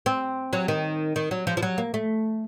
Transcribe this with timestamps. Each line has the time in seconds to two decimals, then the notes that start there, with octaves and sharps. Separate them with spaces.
0.06 C4
0.53 F#3
0.68 D#3
1.16 D#3
1.31 F#3
1.47 F3
1.57 F3
1.63 F#3
1.78 A#3
1.94 A3